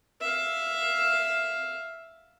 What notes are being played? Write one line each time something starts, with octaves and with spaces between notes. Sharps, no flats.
E5 F5